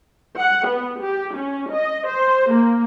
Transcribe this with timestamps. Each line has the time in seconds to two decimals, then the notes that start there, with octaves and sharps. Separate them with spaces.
0.39 F#5
0.68 B3
1.02 G4
1.36 C#4
1.73 D#5
2.07 C5
2.53 A#3